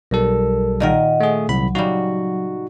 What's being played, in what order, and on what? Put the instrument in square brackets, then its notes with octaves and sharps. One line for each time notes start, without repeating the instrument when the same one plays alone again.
[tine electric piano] B1 G3 A4 [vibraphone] A#4
[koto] A#2 D#3 A#4 [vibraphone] D#5 F#5
[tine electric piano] A3 G#4
[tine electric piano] C2 B5 [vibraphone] F#3
[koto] C#3 G3 [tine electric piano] D#4 F#4